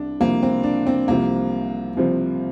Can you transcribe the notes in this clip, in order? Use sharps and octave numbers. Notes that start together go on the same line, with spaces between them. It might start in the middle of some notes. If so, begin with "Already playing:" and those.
Already playing: C2 C3 D4
C2 C3 F3 A#3
C4
D4
C4
C2 C3 F3 A#3
C2 C3 F3